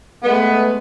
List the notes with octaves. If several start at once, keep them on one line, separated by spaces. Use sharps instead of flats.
G#3 A3 B3